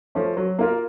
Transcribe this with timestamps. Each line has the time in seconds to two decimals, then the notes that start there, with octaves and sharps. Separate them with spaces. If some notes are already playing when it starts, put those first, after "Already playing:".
0.15 F3 A3 C#4
0.37 F#3
0.59 A#3 F4 A#4